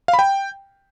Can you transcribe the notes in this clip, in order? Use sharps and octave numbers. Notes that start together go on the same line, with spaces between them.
F5
B5
G5